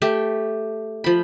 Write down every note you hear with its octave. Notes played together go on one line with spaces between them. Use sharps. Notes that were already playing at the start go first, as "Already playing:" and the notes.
A3 G4
F3 B5